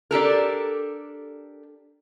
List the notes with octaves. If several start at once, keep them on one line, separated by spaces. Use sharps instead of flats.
D4 G4 A4 A#4